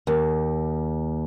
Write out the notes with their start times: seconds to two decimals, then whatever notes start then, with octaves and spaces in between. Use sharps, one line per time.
0.07 D#2